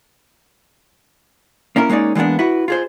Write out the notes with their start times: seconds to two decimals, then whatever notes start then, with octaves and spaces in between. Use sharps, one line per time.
1.76 A#3 C#4 E4 A#4
1.89 G#3 A#3 C#4 D#4 D5
2.15 E3 G#3 A#3 B3 D4
2.39 E4 F#4 B4
2.68 F4 G#4 C5